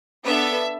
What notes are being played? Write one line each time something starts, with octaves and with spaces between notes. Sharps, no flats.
B3 D4 A4 E5